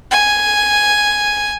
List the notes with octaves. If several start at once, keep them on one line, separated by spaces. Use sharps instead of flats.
G#5